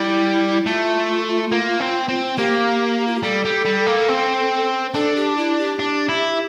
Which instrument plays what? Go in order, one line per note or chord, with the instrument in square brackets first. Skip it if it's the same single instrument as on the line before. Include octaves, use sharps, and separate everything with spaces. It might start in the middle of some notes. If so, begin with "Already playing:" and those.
Already playing: [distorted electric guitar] G3 [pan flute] E4
[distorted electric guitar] A3 [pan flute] F4
[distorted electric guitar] A#3
C4
C4
[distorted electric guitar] A#3 [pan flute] G4
[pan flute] F4
G4
[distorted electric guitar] G3 [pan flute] A4
[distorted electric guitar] G3
G3
A#3
C4
[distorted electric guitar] D4 [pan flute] A4
[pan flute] G4
E4
G4
[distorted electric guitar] D4
E4